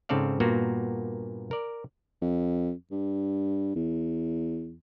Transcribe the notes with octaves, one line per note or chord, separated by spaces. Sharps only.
G#2 C#3 C4 A4 D5 F5
G2 A#2 A#3 B3 F#4
A#4 D5
F2
G2
E2